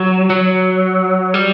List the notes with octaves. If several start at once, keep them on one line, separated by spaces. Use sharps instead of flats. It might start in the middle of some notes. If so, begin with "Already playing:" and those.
Already playing: F#3
F#3
G3